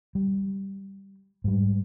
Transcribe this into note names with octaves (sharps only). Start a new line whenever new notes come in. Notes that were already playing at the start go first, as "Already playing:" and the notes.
G3
G#2 G3